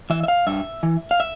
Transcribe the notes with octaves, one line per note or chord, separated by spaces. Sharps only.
E3 E5
E5
F5
G2 E5
E3
F5
E5